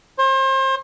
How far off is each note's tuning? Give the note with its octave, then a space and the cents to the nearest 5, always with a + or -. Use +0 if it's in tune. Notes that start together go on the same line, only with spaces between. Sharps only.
C5 +35